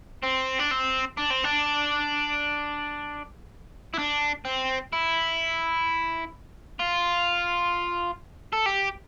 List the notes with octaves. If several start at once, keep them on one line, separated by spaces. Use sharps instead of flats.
C4
D4
C4
D4
C4
D4
E4
D4
C4
E4
F4
A4
G4